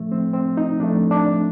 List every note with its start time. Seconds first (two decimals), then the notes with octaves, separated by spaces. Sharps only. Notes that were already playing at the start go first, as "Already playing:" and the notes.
Already playing: A2 F3 A3
0.12 C4
0.33 C4
0.57 D#4
0.80 A2 F3 A3 D4
1.11 D4